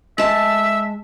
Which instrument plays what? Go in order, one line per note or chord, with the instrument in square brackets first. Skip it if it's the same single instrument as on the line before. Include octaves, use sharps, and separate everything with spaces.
[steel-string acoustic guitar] G#3 A5 [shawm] E5